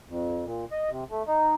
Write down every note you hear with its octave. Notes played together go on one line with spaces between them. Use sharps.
F2
A#2
D#5
C3
A3
D#4